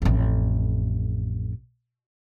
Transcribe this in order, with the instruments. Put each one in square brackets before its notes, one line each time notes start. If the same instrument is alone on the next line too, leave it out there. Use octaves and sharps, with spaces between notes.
[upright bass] A1 F2